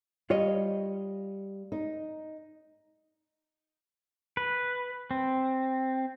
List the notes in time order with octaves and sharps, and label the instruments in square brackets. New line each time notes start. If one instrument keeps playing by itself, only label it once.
[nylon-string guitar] G3 [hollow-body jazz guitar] F4 C#5 D#5
[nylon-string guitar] D#4
[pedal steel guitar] B4
C4